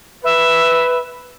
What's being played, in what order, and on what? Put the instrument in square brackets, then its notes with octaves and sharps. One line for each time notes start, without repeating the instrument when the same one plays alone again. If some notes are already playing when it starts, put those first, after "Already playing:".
[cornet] B4 [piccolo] E5